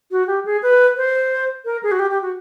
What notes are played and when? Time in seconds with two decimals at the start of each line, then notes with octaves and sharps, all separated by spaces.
0.11 F#4
0.27 G4
0.45 G#4
0.62 B4
0.97 C5
1.65 A#4
1.83 G#4
1.91 F#4
1.99 G4
2.11 G4
2.22 F#4